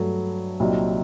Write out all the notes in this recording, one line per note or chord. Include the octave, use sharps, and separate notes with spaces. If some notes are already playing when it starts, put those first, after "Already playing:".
Already playing: G2 F#3 A3
C2 A#2 F#3 C4 D#4